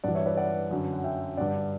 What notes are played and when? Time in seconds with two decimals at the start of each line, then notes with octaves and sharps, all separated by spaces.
0.04 G2 E3 D5 F#5
0.15 C#5 E5
0.26 B4 D5
0.37 D5 F#5
0.71 F#2 D3
0.93 F#5
1.04 E5 G5
1.37 G2 D3 D5 F#5